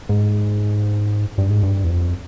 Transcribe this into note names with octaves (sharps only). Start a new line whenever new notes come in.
G#2
G2
G#2
G2
E2
F2